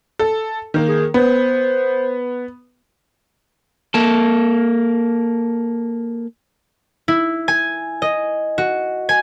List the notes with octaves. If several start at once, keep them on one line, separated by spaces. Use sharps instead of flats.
A4
D#3 A#3
G#4
B3 C5
A#3 A4
E4
G#5
D#5
F#4
G#5